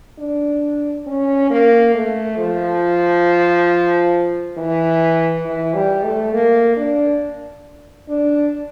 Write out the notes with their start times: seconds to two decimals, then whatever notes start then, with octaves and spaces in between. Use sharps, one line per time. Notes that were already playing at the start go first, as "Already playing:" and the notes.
0.19 D4
1.06 C#4
1.50 A#3
1.94 A3
2.38 F3
4.57 E3
5.45 E3
5.74 G3
6.04 A3
6.33 A#3
6.77 D4
8.08 D4